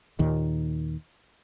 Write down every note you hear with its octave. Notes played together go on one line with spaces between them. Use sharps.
D#2 A#2 D#3